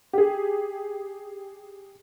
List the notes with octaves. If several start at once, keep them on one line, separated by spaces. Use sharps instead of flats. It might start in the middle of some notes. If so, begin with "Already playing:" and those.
G4 G#4